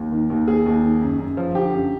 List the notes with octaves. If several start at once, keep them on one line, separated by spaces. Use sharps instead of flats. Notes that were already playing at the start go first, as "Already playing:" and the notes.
Already playing: D#2
D#3
D#2
D#3 G#4
D#2
D#3
F#2
F#2
F3
D3 G4
F#2